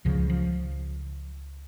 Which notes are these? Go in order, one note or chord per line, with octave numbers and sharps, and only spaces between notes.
C#2 C#3 F3
F3